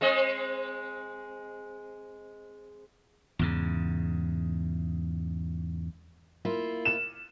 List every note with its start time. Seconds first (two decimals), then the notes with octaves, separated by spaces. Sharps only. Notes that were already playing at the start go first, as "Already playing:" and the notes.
0.01 G#3 C4 D#5
3.39 E2 G#2 C#3
6.45 A#3 E4 F4
6.85 E7